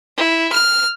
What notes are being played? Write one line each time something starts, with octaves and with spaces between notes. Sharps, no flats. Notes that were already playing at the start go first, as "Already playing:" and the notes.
E4
F6